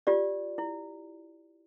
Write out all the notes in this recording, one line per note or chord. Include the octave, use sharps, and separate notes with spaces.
F4 G4 D5
E4